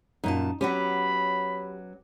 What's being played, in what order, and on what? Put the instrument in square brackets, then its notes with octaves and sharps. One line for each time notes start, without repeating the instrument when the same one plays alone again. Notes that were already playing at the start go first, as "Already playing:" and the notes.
[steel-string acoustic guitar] F#2 A#2 A5 [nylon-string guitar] D#4
[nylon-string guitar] F#3 B3 C#4 [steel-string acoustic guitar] G4 [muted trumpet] B5